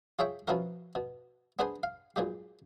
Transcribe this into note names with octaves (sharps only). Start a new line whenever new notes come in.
F4 G#4 C#5 E5 G5
B2 F3 C#4 E4 F#4 A#4
B2
B3 D4 G#4 B4 C5 G#5
F5
B1 A#2 G#3 G4